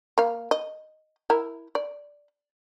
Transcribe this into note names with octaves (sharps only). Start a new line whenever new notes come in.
A#3 F5
D#5
E4 A#4
D5